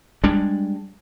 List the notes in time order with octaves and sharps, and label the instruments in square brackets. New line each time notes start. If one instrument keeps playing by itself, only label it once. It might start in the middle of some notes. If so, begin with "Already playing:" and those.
[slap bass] G3 G#3 D4